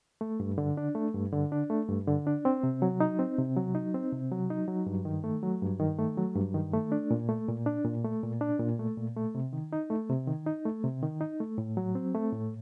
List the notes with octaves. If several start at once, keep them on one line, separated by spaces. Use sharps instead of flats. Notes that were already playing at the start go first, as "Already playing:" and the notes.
A3
G2
D3
D4
A3
G2
D3
D4
A3
G2
D3
D4
C4
C3
F#3
D#4
C4
C3
F#3
D#4
C4
C3
F#3
D#4
F#3
G2
D#3
A3
F#3
G2
D#3
A3
F#3
G2
D#3
A3
D4
A#2
A3
A#2
D4
A#2
A3
A#2
D4
A#2
A3
A#2
A3
C3
D#3
D#4
A3
C3
D#3
D#4
A3
C3
D#3
D#4
A3
A2
F#3
C4
A3
A2